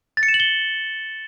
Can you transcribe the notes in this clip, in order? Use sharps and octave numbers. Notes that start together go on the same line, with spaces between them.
A6
C#7
E7
F#7
G7